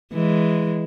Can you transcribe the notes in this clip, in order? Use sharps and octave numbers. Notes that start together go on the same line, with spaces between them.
E3 G#3